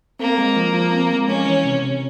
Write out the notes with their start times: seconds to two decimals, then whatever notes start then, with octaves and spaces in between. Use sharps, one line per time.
0.20 A#3 C4
0.38 G#3
0.56 F3
0.74 F3
0.92 C4
1.10 G#3
1.28 G#3 C#4
1.46 E3
1.64 C3
1.82 C3